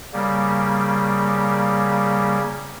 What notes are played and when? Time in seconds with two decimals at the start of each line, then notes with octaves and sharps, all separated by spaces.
0.13 C#3 G3 A#3